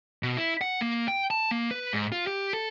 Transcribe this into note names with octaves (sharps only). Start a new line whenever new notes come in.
B2
E4
F#5
A#3
G5
A5
A#3
B4
G#2
F4
G4
A4